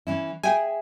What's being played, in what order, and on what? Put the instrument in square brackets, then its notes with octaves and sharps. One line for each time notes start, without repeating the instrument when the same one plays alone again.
[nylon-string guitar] E3 C#4 E4
[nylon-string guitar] G#4 E5 [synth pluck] G5 G#5